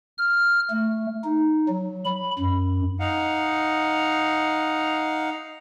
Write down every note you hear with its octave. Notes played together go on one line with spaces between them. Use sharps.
F6
A3
D#4
F#3
B5
F#2
D#4 F5 F#5